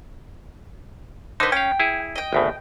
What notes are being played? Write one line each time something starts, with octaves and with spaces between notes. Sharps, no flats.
D3 D#4 B4 C5
C#4 F5 G5
E4 G#4
D#5 G5
G#1 D2 B2